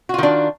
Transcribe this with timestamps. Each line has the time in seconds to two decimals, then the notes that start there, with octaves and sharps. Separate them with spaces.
0.09 F#4
0.14 F4
0.18 D#3
0.23 D4